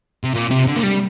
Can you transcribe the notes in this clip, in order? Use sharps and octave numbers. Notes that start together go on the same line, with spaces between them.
C3
A#2
C3
D3
A#3
G3